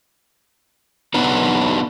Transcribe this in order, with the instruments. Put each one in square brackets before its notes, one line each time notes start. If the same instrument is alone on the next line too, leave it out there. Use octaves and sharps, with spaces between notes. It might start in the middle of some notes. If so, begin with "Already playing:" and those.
[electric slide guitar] F#3 B3 D4 D#4 B4